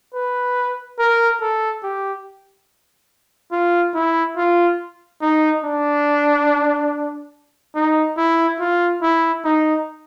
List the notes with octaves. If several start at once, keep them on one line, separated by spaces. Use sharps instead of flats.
B4
A#4
A4
G4
F4
E4
F4
D#4
D4
D#4
E4
F4
E4
D#4